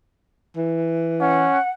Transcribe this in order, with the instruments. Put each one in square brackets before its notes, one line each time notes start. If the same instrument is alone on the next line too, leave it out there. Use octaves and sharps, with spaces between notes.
[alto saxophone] E3
[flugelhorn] C#4 [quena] F#5